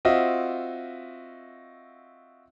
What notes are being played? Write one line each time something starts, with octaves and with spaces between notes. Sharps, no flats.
C4 F4 F#4 D#5 E5